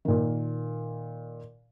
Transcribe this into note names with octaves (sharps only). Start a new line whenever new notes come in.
A#2 D#3